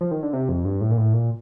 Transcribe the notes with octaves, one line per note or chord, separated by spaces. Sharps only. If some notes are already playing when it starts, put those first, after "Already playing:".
F3
D#3
D3
C3
F2
G2
A2
A#2
A2
A#2